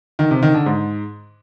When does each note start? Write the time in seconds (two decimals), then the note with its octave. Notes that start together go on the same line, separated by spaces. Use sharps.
0.19 D#3
0.31 C3
0.43 D#3
0.54 D3
0.66 G#2